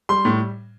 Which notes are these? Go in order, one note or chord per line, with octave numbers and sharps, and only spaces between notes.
G3 C6
A2